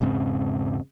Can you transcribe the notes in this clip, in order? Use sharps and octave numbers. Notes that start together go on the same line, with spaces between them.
E1 G#2 C#3 C4